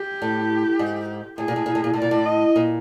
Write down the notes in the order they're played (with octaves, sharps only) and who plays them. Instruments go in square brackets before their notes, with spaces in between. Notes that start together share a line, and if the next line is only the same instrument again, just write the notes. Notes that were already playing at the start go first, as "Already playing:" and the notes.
Already playing: [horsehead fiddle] G4
[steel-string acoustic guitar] A2
G#2
[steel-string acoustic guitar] A2 [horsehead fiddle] G#4
[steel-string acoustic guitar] A#2
A2
A#2
A2
A#2
A2
[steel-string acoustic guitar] A#2 [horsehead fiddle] D5
[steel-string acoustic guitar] A2
[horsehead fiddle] D#5
[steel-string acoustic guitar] A#2